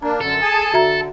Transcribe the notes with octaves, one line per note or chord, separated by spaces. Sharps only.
A#3 D4 A#5
F#2 D3 A4
G#4 G#5 A5
D3 F#4 E5 A#5